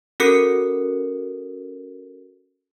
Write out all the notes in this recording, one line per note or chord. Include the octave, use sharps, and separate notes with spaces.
C#4 F#4 A4 A#4 F#6 C#7